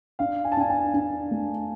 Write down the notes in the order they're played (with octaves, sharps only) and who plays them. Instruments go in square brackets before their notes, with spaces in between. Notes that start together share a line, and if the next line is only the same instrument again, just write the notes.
[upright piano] D4 [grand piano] F5
[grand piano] G#5
A5
[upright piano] D4 [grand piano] G#5
[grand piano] G#5
[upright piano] D4
A3